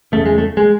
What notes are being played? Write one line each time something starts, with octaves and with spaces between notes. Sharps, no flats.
E2 C#3 A3
G#3
A3
G#3